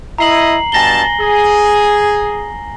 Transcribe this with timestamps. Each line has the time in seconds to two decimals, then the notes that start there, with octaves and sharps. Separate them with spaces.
0.18 E4 D#5 A#5 C7 F#7
0.72 G2 B2 G#5 A5 A#6 G7
1.19 G#4